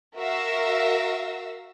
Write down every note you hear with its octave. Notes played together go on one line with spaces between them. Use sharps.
F#4 A#4 E5 F5 E6 A#6